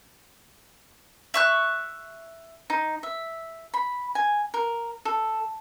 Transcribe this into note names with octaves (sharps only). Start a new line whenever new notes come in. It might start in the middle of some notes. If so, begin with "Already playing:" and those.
E5 C#6 F#6
D#4
E5
B5
G#5
A#4
A4